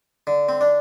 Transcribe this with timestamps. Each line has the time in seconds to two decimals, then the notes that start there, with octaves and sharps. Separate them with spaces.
0.27 D3
0.49 C4
0.61 D4